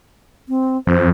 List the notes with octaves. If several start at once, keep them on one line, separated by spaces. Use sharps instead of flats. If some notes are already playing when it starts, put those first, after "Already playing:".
C4
F2 C5